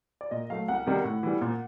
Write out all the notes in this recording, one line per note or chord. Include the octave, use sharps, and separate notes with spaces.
D5
A#2 D#5
F#3 A3 F5
C2 F#5
C3 D#3 G3
A2
E3 G3
A#2